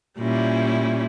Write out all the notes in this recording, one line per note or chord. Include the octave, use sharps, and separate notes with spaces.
A#2 G3 C#4 E4